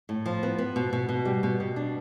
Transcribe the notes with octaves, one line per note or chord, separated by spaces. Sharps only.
A2
F3
B3
B3
B2
B2
B2
G3
B2
B2
D4